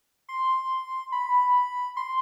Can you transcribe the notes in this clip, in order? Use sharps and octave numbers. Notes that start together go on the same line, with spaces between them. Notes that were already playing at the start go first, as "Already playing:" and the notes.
C6
B5
C6